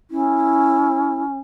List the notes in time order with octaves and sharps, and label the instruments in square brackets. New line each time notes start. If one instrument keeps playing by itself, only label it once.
[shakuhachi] C#4 [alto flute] E4